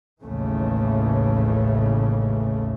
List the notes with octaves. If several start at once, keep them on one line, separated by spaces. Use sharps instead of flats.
A1 D#2 A2 C#3 E3 A3